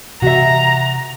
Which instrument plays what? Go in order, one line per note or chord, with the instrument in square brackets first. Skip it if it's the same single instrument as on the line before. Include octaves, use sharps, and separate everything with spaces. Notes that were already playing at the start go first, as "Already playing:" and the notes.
[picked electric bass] C3 E3 [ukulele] F#4 E5 [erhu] A#5